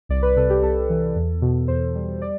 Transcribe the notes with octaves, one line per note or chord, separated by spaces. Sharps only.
C2 D5
B4
C3 A4
G4
C2 A4
E3
E2
B2
E2 C5
G3
D5